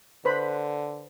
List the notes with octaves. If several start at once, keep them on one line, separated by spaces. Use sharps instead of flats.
D3 B4 C5 B5